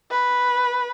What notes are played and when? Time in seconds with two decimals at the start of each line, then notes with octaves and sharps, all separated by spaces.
0.10 B4